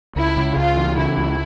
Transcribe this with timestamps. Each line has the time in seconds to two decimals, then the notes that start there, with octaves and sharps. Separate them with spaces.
0.16 C#2 E4
0.37 C#3
0.56 C#2 F4
0.77 E3
0.97 C#3 E4
1.17 C#2